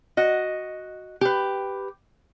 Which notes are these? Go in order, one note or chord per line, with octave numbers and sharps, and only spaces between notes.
F#4 D#5
G4 B4